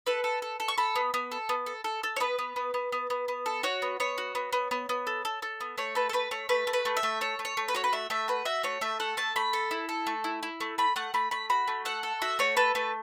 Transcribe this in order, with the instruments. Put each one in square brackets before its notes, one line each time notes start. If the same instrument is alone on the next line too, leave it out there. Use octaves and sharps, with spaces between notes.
[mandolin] A4 B4
A4
A4
A4
C#6
A4 B5
B3
B3
A4
B3
A4
A4
A4
C#5
B3 B4
B3
B3
B3
B3
B3
B3
A4
F#4 C#5
B3
B3 C#5
F#4
B3
B3
B3
B3
A4
A4
A4
B3
A3 C#5
A4 B4
A4
A3 B4
A3 C#5
A3 B4
A3
B4
A3
E5
A3
A4 C#5
A3
C#5
A3
B4
F#4 C#5
B4
A3 E5
A3 E5
F#4 B4
F#4 E5
A3 C#5
A3 E5
A4 F#5
A3 A5
A3 B5
A4
E4
A4
A3
E4
E4
A3
A3 B5
A3 F#5
A3 B5
A3 B5
F#4 B5
A3
A4 F#5
A4
F#4 E5
A3 C#5
A4 B4
A3 B4